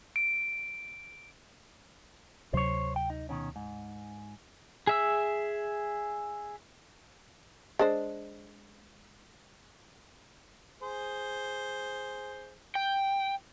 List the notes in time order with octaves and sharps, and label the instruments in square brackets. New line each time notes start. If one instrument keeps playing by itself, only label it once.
[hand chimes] D7
[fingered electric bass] D2 C3 F#3 [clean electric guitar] C5 C#5
[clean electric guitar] G5
D#4
B2 D#3 C#4
G#2
[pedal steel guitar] G#4 E5 E6
[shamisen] G#3 D4 C5
[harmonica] G#4 C5
[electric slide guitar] G5